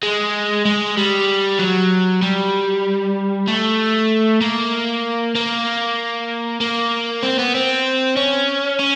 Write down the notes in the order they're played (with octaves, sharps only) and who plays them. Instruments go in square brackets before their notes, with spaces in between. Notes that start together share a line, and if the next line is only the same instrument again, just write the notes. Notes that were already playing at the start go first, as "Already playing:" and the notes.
[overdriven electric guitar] G#3
G#3
G3
F#3
G3
A3
A#3
A#3
A#3
C4
B3
C4
C#4
C#4